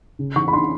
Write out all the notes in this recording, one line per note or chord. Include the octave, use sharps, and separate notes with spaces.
C#3
E3 C#6
B5
D4 C6